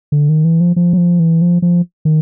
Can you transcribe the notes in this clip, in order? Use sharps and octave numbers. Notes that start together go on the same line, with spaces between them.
D3
D#3
E3
F3
F3
F#3
F3
E3
F3
F3
D#3